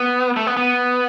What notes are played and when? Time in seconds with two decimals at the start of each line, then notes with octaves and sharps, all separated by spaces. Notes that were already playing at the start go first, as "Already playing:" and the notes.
Already playing: B3
0.37 A3
0.47 B3
0.57 B3